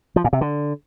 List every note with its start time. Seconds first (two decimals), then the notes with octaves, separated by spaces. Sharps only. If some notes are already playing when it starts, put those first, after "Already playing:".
0.16 F3
0.24 A#2
0.33 C3
0.41 D3